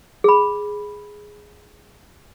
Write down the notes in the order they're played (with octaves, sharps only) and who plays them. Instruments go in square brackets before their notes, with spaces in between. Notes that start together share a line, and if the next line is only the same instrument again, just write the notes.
[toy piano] G#4 B5